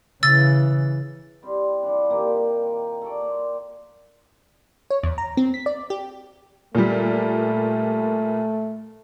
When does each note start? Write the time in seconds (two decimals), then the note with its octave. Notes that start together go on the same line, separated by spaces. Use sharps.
0.23 C#3 E3 E6 A6
1.43 G3 C4 E4
1.83 E3 F3 D4
2.10 A#2 D#3 A#3 G4
3.02 A4 C#5 D5
3.22 A#3 C5
4.90 C#5
5.03 E2
5.18 A#5
5.37 C4
5.54 B6
5.66 D5
5.90 G4
6.75 A#2 G3 A3